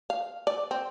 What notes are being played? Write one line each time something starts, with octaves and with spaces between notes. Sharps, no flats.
F5
D5
C4